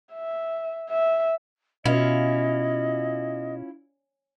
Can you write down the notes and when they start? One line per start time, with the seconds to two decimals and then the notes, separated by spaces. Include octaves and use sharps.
0.13 E5
0.90 E5
1.86 B2 C#4 E4 F4 D#5 F5